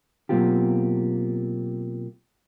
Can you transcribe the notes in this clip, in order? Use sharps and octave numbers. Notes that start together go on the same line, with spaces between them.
B2 F#3 A#3 C4 F4 G4